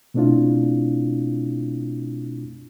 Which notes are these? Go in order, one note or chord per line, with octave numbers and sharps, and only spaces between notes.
B2 A3 C4 D4 E4 F4